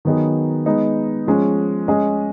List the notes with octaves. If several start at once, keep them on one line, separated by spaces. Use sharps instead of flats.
D#3 F#3 B3 D#4 G#4
G#3 B3 D#4
F3 G#3 C#4
G#3 C#4 G#4 D#5